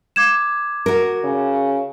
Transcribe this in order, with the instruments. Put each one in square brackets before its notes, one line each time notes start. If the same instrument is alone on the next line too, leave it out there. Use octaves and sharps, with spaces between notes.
[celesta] D6 G#6 E7
[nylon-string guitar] F#4 A#4
[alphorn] C#3